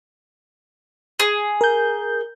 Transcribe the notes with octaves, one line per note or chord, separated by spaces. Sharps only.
G#4
A#4 G6